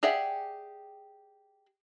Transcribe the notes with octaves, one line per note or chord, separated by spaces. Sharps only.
G4 G#4 D5 E5 F#5